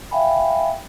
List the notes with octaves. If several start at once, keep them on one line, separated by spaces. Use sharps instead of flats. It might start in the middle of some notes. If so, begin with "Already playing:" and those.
E5 F5 G5 G#5 B5